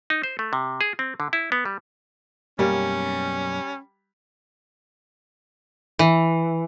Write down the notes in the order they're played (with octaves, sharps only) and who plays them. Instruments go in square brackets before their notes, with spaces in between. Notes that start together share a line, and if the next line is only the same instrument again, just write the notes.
[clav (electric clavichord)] D#4
C5
A3
C3
G#4
C4
D3
E4
B3
G3
[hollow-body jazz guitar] B1 F#2 A#3 [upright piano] G3 [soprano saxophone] C#4
[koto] E3